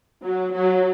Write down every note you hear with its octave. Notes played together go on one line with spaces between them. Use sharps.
F#3
F#3